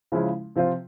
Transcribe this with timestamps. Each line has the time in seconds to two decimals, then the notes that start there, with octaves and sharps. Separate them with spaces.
0.12 C#3 F3 G#3 C#4 E4
0.56 C3 F3 C4 F4